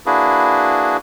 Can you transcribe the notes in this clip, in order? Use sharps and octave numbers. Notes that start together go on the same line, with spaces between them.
A#3 D4 E4 F#4 G#4 B4